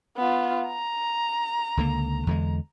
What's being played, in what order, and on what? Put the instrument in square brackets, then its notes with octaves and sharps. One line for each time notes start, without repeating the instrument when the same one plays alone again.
[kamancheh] B3 F4
A#5
[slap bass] C#2 D3 A#3
E2 D3 G#3